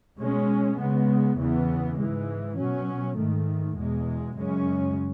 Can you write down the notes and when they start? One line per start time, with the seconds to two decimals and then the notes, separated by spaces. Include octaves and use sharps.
0.18 B2 G#3 C#4
0.78 C#3 G#3 B3
1.37 E2 C#3 E3 B3
1.97 G#2 E3 G#3
2.57 B2 F#3 C#4
3.16 G#2 D#3 A3
3.76 E2 B2 G#3
4.36 F#2 C#3 G#3 C#4